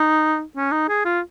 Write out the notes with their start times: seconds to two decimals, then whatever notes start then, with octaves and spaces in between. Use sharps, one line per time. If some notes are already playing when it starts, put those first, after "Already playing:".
Already playing: D#4
0.57 C#4
0.72 D#4
0.89 G#4
1.05 F4